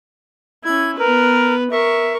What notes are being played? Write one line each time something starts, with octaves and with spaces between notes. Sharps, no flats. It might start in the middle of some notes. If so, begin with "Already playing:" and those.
C#4 E4 G#6
B3 A#4 B4
A#4 E5 C#6